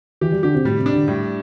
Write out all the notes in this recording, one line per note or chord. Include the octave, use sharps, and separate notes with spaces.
E3 G4
G3
D3 G4
C3
A2 G3
C3
D4
D3
A2 G3